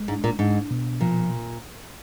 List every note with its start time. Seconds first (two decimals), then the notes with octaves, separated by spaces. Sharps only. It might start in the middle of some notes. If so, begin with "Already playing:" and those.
Already playing: G#3
0.08 G#2 D4
0.24 A#2
0.39 G#2 D4
0.70 B2
1.01 A#2 F3